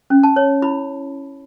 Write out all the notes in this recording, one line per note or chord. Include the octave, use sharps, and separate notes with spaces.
C#4
A5
C#5
E4 B5